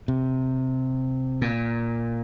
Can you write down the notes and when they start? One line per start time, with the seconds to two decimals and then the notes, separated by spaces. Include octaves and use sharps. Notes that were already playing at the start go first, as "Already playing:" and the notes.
0.08 C3
1.41 A#2